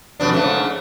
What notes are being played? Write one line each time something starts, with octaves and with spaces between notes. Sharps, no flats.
F2 B2 D4
G#2 C#3 A3